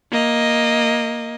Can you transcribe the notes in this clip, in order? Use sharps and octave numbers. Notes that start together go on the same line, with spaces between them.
A#3 D#5